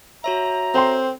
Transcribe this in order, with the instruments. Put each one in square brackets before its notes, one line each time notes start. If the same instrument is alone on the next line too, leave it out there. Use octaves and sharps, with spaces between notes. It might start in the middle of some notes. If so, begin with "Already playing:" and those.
[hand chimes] F#4 C#5 E5 [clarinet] A#5
[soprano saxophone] C4 [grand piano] A4 G5 C6